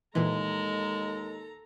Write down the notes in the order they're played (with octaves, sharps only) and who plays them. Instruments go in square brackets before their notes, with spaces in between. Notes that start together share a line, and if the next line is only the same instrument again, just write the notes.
[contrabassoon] D#2 [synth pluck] A#2 E3 [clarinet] G#3 [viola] A4 A#5